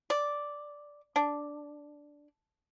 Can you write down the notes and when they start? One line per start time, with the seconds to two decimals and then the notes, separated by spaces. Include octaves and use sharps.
0.10 D5
1.16 D4